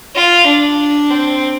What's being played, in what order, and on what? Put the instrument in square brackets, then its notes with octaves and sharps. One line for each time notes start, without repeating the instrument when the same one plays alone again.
[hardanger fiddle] F4
D4
C4